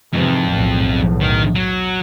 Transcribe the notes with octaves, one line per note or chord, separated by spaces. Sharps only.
F2 G#2 C3 E3
B1 E2 A2
D#3
F#3